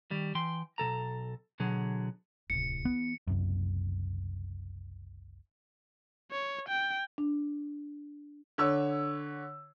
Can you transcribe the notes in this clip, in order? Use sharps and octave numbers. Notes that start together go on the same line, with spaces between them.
D#3 G3
E3 G5 C6
B1 C#3 A4 A#5
B2 D3 F#3 G#4
D1 C2 C#7
E3 B3
F#1 C2 F#2
C#5
G5
D4
D3 C#5 E6